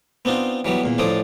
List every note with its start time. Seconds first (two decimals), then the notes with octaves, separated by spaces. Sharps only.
0.25 B3 C4 D4 D#4 F4
0.65 E3 F#3 G3 B3
0.84 E2 A#2
0.98 A1 A2 F3 A4 D5 D#6